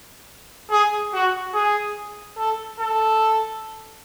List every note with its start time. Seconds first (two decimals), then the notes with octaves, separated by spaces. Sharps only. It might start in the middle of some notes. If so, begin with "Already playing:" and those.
0.71 G#4
1.13 F#4
1.54 G#4
2.38 A4
2.80 A4